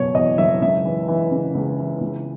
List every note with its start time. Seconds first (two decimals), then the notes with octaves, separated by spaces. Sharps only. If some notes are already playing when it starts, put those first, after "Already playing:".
Already playing: F#1 E2 B2 C#5
0.15 E2 D#5
0.38 F#1 E5
0.62 C#2 E5
0.85 E3
1.08 E3
1.31 C#3
1.55 C#2
1.79 E3
2.01 C#2